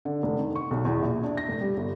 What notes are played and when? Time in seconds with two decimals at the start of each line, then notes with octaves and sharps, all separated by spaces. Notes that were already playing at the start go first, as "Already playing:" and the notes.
0.05 D3
0.23 F1
0.39 D#3
0.55 C#6
0.71 B1
0.85 E2
1.02 A#1
1.23 D4
1.37 A#6
1.49 F1
1.61 G3
1.77 G1